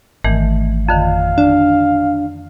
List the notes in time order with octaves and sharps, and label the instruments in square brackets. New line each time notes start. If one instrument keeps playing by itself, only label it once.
[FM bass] G#1 [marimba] D#3 E3 A3
[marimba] F2 D3 D#3 [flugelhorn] F5
[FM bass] D4